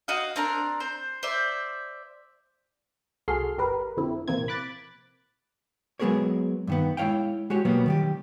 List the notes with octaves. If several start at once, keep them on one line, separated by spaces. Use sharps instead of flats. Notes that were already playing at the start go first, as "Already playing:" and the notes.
F#4 D#5 F5
C4 D4 A#4
C5
C5 D5 E5
C2 F#4 G#4 A4 C6 F6
G1 G3 A#4 B4
F2 D3 C4 E4
A#1 C3 E3 A#3 C4 G#6
B5 D6 F#6 A6
F#3 G#3 B3 G#4 A#4 C#5
G2 D#3 B3
G#3 E4 C#5 F5 G5
G#3 F#4 G4 C#5
B2 F#3 G3 A#3 B3
D#3 G3 G4